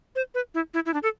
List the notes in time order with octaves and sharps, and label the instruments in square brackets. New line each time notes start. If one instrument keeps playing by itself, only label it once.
[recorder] C5
B4
E4
E4
E4
D4
A4